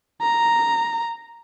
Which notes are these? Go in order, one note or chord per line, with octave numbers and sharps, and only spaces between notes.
A#5